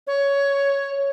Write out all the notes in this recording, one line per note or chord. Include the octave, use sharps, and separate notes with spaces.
C#5